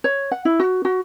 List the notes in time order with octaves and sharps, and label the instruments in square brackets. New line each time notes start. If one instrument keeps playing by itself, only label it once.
[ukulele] C#5
F#5
E4
F#4
F#4